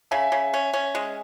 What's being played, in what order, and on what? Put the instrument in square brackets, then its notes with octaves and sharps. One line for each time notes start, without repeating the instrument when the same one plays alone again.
[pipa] C#3 [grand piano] E5 G#5
[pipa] C#3
C#4
C#4
G#3